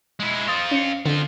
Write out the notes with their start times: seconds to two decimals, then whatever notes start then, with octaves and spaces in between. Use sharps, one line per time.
0.20 G#3 E4
0.48 C4 F4 D#6 A6
0.71 C#4 C#7
1.06 D3 C4 F4